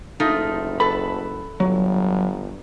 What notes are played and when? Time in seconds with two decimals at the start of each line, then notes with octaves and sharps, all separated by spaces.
0.20 F#1 A3 D#4 F4
0.80 A4 B4 B5
1.60 G1 F#3